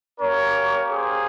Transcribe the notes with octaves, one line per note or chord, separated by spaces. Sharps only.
A#3 C#4 G4 A#4 C#5
G#4 C5